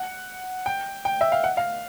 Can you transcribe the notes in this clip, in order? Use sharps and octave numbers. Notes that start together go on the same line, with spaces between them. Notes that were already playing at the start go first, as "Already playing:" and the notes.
Already playing: F#5
G5
G5
E5
F5
F#5
F5